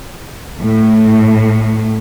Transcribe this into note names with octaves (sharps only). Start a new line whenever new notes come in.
A2